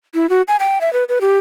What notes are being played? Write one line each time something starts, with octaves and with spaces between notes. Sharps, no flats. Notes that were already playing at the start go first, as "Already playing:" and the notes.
E4
F#4
G#5
G5
E5
B4
B4
G4